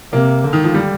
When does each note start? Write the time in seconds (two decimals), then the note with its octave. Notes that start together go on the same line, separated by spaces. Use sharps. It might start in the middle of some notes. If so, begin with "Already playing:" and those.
0.13 C3 A#3
0.44 D3
0.53 D#3
0.64 F3
0.74 G3